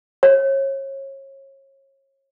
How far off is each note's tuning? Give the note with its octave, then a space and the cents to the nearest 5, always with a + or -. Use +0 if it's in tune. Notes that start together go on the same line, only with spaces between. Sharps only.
C#5 -30